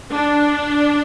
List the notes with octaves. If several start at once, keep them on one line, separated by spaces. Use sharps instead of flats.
D4